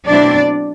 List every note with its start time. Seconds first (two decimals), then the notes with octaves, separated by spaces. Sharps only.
0.09 B2 F#3 A3 C4 D4 E4 D5